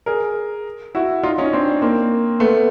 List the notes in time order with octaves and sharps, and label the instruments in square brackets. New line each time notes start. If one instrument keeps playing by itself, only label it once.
[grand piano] G#4 A#4
E4 F#4
D#4 F4
C#4 D#4
C4 D4
A#3 C4
A3 B3